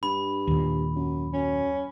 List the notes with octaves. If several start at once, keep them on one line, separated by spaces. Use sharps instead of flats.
G2 B5
D#2 A#2
F#2
F#2 C#4